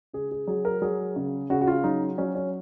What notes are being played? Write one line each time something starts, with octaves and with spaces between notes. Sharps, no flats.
C#3 G#4
G#4
F#3 G#4
A#4
F#3 G#4
C#3
C#3 F#4
F#4
F4
F#3 D#4
F#3 C#4
C#4